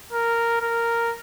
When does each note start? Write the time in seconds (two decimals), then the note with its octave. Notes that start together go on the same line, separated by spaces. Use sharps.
0.13 A#4
0.61 A#4